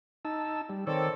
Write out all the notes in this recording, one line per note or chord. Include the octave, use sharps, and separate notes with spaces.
D#4 A5 E6
G3
D#3 C4 A4 C#5 D5